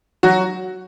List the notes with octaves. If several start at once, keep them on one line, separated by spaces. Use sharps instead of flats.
F#3 F#4